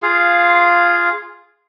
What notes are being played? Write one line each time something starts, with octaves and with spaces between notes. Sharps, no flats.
F4 G#4 F5